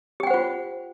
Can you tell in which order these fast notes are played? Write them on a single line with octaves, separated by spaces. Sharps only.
G4 G5 F#5 C5 F4